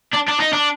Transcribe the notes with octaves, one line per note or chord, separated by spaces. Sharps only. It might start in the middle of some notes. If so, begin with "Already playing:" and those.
D4
D4
D#4
D4